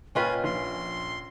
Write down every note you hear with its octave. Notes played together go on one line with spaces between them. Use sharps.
A#2 C#4 F4 B4 D#5 G5 G#5
A#1 C6